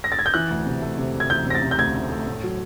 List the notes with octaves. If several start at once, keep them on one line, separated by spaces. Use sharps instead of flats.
A#6
A6
G#6
G6
E3 F#6
D2
C3
A3
C3
D2
G#6
E3 G6
C3 A#6
A6
C3
G6
D2 G#6
A3
A3
A2
F#3